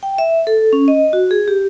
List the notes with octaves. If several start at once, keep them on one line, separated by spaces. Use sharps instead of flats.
G5
E5
A4
C#4
D#5
F#4
G#4
G4